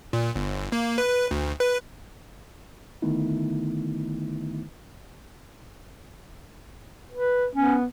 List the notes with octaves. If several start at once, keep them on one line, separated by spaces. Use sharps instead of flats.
A#2
G1
A#3
B4
D2
B4
D3 D#3 A3 B3 D#4 E4
B4
B3 C#4